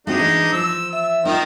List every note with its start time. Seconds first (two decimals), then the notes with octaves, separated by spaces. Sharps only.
0.07 G#3 A3 C4 D4 D#4 F#4
0.20 E3
0.52 F3 E6
0.93 E5 E6
1.25 D#3 F3 D#4